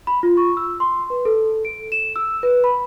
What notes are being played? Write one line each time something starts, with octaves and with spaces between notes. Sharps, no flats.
B5
F4
C#6
E6
C6
B4
A4
D7
E7
E6
B4
B5